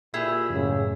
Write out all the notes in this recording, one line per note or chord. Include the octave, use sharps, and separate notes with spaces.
A#2 E4 G4 G#4 E5 E6
F#2 A2 C#3